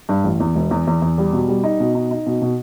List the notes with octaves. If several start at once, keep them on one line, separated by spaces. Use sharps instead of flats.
G2
A1
E2
E1
E2
E2
E2
G3
B2
G3
D#4
B2
D#4
D#4
B2
B2